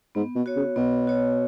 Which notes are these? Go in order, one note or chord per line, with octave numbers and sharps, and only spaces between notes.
G#2 B3
B2
F#4 C#5
C#3
B2 B3
F#4 C#5